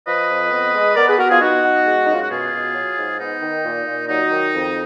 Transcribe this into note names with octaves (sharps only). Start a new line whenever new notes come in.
F3 B4 D#5
F2
B3
G#3
B3 A#4 D5
G#4 B4
B3 F#4 A#4
F4 G#4
B3 D#4 F#4
B3
G#3
D#4
F#2 F4
F#4
B2 F4 G#4
B2
F#3
G#2
B3 D#4
D#3
A#2
A#2
F#3 D#4
D#3
F2